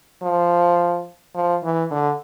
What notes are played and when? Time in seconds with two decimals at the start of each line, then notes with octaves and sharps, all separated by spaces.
0.22 F3
1.35 F3
1.64 E3
1.91 D3